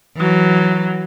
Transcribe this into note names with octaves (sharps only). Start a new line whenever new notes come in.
E3 F#3